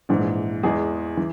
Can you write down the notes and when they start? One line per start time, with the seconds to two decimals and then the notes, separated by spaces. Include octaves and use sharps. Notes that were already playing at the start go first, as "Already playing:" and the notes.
0.09 A#1 G#2 E3
0.63 E2 E3 G#3 G#4
1.17 E3